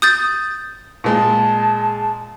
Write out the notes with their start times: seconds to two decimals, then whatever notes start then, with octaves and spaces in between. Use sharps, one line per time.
0.02 D#6 G6 A6
1.04 A#2 G#3 A5